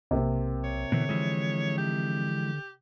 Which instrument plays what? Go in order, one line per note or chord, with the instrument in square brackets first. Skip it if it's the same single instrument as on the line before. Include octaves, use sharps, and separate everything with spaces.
[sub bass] B1 [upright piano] C3 A#3 C4
[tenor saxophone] C#5
[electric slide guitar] B2 E3 [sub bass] D3
[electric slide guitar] E3 F3 G#3
[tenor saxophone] G4